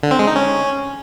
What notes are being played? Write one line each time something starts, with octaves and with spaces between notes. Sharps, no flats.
D3
C4
G#3
D#4
C#4